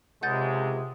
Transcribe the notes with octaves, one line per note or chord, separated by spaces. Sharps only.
C#2 C3 G#3 F#5 G6 A6